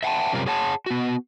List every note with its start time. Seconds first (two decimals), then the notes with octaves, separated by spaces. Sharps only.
0.03 E5 F#5 G5 A5
0.33 F#2 C3 G3 F4 A#4
0.46 G#4 C#5 F#5 A5
0.86 B3 F#4